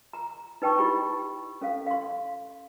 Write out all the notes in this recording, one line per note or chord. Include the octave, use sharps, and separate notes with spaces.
A#5
D#4 B4 G5 A5 C#6
E4 G4 B5 C#6
C#4 A4 F5
F5 C6